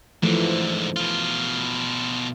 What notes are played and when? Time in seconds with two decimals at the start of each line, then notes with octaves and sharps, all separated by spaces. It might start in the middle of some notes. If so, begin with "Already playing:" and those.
0.23 G#2 D3 E3 F3 A3
0.96 B2 F4